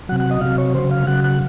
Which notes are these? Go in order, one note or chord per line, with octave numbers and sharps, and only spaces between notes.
C3 F#3 F#5
F#5
D#5
C3 F#3 F5
C#5
C#3 F#3 C5
F5
C#3 F#3 F#5
F#5